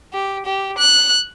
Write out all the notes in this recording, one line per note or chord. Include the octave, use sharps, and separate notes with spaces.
G4
G4
F#6